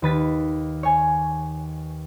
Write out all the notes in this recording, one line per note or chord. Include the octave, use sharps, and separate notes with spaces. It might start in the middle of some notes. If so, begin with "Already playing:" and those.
D#2 B4 A6 B6
C#5 G#5